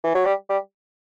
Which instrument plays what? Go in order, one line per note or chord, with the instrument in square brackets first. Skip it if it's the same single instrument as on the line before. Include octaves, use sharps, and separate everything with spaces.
[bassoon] E3
F#3
G3
G3